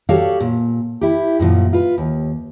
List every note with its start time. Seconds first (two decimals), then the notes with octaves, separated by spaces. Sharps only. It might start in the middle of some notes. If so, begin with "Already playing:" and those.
0.09 F#4 G4 A4 C#5 D5 F5
0.40 A#2
1.01 E4 G4
1.39 F#2 A#2 D#3 F3
1.73 F4 B4
1.98 D#2